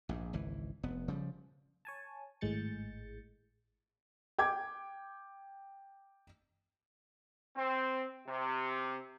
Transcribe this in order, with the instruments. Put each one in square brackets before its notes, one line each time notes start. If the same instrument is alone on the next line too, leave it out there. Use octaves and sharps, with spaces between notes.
[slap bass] A#1 G#2
G#1 C#2 E3
F1 B3
C#3 F3 G3
[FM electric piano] C#5 G#5 A5
G#1 A2 G#3 G6 A6 C#7
[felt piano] G5 D6 G#6
[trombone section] C4
C3